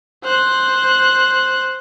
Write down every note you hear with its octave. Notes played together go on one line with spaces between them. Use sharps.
C5 F#6